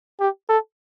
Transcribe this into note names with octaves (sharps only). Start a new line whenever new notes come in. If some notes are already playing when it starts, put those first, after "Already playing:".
G4
A4